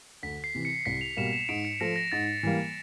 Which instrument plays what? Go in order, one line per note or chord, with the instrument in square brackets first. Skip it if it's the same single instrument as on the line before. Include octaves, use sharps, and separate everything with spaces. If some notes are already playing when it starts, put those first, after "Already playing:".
[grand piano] D2 [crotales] B6
[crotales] C7
[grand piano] C3 E3
[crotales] C#7
[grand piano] C2 [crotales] B6
[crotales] F7
[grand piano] B2 G3 A#3 [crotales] E7
[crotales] E7
[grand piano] G#2 [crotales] D7
[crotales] C#7
[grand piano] F3 A3 [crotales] A#6
[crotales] A#6
[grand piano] G#2 [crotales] A6
[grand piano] E3 G3 A#3